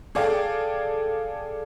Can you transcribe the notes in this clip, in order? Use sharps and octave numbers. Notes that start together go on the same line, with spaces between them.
G#4 A4 D5 F5 G5